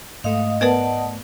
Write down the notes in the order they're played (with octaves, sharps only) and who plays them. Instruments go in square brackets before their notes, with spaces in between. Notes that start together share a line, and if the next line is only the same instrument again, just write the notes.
[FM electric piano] G#2 A3 [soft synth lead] D#5 [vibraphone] F5 D#6
[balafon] B3 A#4 B4 [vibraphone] D5 F#5 A5